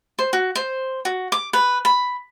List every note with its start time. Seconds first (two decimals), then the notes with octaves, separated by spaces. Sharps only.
0.19 C5
0.33 F#4
0.55 C5
1.05 F#4
1.32 D6
1.53 B4
1.85 B5